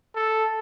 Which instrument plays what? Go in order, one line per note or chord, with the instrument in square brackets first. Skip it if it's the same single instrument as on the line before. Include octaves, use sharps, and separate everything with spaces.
[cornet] A4